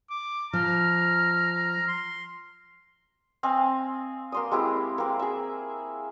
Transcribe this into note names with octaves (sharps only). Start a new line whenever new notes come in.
D6
F3 A#5 F6
C6
C4 D#5 F5 G#5
A#3 C6 D#6
G#3 C4 E4 G4
A#3 C4
G#4 E5